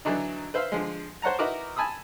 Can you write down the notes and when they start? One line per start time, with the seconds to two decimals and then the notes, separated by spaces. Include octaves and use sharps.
0.05 D3 E3 F#3 D4 D#4
0.54 B4 C5 E5 F5
0.72 D3 F3 G#3
1.22 C5 C#5 F#5 A5 A#5
1.39 D#4 E4 F#4 A#4 B4 D6
1.76 G#5 A5 B5 D#6 E6